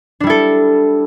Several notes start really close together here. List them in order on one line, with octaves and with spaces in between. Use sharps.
D4 G3 E4 A4